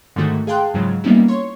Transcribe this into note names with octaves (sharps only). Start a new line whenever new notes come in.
G#2 D3 D#3 A3 F#4
G#4 F5 G5 A5 C6 F#6
G#2 C#3 F3 F#3 G#3
G3 A#3 B3 C#4 D#4 E4
C#5 C6 C#6